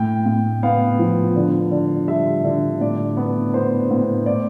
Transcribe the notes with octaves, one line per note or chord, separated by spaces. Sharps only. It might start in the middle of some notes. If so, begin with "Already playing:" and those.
Already playing: A2 G5
A2
B3 F5
F3
D3
D3
G3 E5
D3
A2 D5
B3
B3 C5
A2
A2 D5